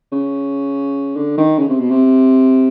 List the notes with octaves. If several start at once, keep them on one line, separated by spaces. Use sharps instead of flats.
C#3
D3
D#3
C#3
C3
B2
C3